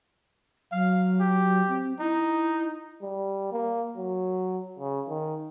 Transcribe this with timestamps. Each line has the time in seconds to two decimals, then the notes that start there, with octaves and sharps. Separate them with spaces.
0.72 F#3 F5
1.20 G4
1.68 C4
2.00 D#4 E4
3.02 G3
3.52 A#3
3.97 F#3
4.79 C#3
5.08 D#3